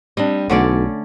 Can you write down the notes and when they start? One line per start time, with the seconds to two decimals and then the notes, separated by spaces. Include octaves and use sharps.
0.17 G3 C4 D4 D#5
0.50 B1 D3 A3 C#4 D5